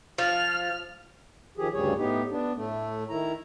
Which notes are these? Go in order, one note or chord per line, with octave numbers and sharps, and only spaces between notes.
F3 F6
D#3 F3 G4 G#4
D2 G2 C#3 G3 G#4 C#5
A2 B3 D#4 G4
B3 D4
A2 A3
D#3 E4 A#5